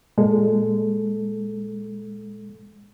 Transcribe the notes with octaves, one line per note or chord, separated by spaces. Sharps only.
A#2 G#3 A4